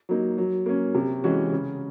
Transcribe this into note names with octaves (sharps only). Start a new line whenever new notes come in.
F#3 A#3 D#4
F#3
A#3 C#4
C3
E3 G#3 C#4 F#4
C#3